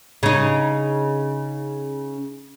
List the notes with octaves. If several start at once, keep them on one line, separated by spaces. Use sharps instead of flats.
C#3 D#4